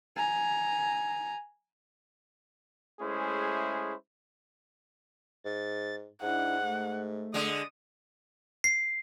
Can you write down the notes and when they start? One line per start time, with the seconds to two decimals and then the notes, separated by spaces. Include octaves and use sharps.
0.16 G#5 A#5
3.00 G#3 A3 C#4 E4 G#4 C5
5.45 G#2 A6
6.22 G#2 D4 E4 F#5
6.62 A3
7.34 D3 G#3 D#6
8.64 C7